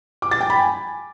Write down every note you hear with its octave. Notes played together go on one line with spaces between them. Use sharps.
D6
A6
G5
B5
G#5